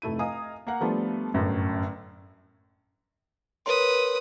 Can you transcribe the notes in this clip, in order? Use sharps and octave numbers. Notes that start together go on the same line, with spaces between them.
F1 A3 E4 D#7
D#5 F5 G#5 A#5 D#6
A#3 A#4 F5 F#5
F3 G3 A3 B3 D4 F4
G1 F#2 A2
A#4 B4 C#5 C6 D#6